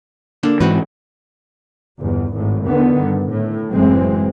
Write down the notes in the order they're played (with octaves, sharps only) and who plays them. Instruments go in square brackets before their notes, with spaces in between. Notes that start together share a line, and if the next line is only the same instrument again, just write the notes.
[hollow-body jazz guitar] D3 A#3 D4
[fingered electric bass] G#2 E3 [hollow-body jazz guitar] C4 F#4 B4
[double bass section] G1 E2
G#1 A2
E2 D3 D#3 B3
G2
A2
F#1 F#2 E3 G#3 C4